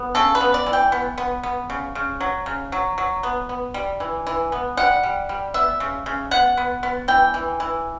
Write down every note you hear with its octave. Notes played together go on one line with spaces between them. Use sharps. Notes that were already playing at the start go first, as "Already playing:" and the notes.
Already playing: B3
C#3 A4
B4
B3
D5
E3
G5
B3
B3
B3
C#3
C#3
F#3
C#3
F#3
F#3
B3
B3
G3
E3
E3
B3
G3 F#5
G3
G3
B3 E5
C#3
C#3
B3 F#5
B3
B3
E3 G5
E3
E3